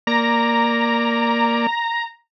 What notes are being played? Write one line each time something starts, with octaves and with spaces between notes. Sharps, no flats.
A#3 D5 A#5